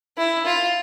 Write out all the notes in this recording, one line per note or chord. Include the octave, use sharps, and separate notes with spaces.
E4
F4